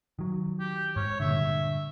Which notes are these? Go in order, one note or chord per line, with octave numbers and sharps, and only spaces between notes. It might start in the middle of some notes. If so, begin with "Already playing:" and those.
D#3 F#3
G4
G#2 C#5
G2 A#2 D3 E5